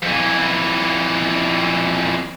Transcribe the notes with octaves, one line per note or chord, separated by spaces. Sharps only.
F2 E3